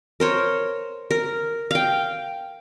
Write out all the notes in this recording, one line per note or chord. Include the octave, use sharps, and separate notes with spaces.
A#4 C5 C#5
A#4
F5 G5